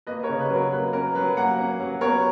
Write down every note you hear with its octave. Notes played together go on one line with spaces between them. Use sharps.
A#3 B4 D#5
A#4 C#5
C#3
B4
F#3
A#4
A#3 B4
C#4 A#4
F#3 B4
A#3 F#5 A#5
C#4
F#3
B3 A#4 C#5